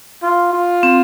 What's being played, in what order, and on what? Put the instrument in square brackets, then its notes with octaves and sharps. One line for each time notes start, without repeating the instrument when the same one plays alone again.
[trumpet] F4
F4
[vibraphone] C4